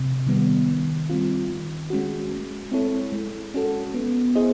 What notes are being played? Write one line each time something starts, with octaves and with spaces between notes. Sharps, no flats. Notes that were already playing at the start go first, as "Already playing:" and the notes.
Already playing: C3
D#3 G3 B3
D#3
G3 C4 F4
D#3
G#3 C#4 F#4
G#3
C4 E4 A4 C#5
G#3
C#4 F#4 A4
B3
E4 G#4 C5 D#5